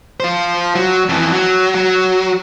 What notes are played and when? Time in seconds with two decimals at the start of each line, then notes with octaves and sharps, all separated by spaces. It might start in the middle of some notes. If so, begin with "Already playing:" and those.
0.20 F4 C5
0.75 F#3
1.09 F2 E3
1.32 F#3
1.75 F#3